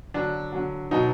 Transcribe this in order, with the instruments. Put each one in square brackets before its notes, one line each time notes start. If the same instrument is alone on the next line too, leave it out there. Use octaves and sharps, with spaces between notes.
[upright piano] D3 F#3 D4
D3 F#3
B2 F#3 D#4